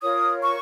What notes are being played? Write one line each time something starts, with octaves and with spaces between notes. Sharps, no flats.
F4 A#4 C#5 D#6
C#6